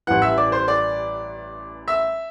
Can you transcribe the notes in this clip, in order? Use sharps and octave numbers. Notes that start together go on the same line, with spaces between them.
A1 G2 E3 F#5 F#6
E5 E6
D5 D6
C5 C6
D5 D6
E5 E6